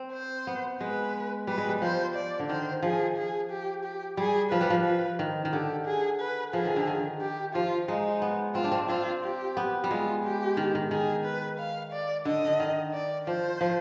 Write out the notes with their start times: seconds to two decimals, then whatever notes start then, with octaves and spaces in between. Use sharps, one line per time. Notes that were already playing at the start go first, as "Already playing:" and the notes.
Already playing: C4
0.13 C5
0.47 B3
0.81 G#3 B4
1.47 G3 B4
1.58 G#3
1.69 G3
1.82 F3 C5
2.15 D5
2.39 D3
2.49 D#3 C5
2.83 F3 G#4
3.17 G#4
3.50 G4
3.84 G4
4.17 G3 G#4
4.51 F3 B4
4.61 G3
4.70 F3
4.84 B4
5.19 D#3
5.45 D#3
5.52 D3 G4
5.85 G#4
6.20 B4
6.53 F3 G#4
6.65 D#3
6.76 D3
6.87 D#3
7.21 G4
7.54 F3 F4
7.88 G#3 D#4
8.22 B3
8.55 C4 F4
8.64 D4
8.72 C4
8.89 C4 F4
9.23 G4
9.57 B3
9.84 G3
9.90 G#3 F4
10.24 G4
10.57 D#3
10.75 D#3
10.91 D#3 G#4
11.25 B4
11.59 F5
11.93 D5
12.25 D3 D#5
12.45 D3
12.60 D#3
12.94 D5
13.27 F3 C5
13.61 F3